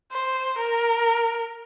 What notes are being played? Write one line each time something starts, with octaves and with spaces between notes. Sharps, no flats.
C5
A#4